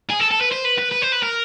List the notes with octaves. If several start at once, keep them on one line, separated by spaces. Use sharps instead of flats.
G#4
A4
A4
B4
C5
B4
B4
B4
C5
B4
A#4